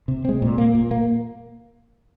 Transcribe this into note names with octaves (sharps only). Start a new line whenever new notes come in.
C3
G#3 C4
A#2
A#3
A#2
A#3